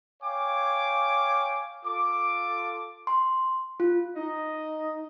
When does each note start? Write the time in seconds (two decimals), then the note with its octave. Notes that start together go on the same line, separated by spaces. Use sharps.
0.22 C#5 F5 G5 G#5 D6
1.85 F4 A4 D6
3.07 C6
3.80 F4
4.16 D#4 D#5